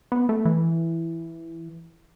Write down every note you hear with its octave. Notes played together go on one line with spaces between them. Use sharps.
B3
A3
E3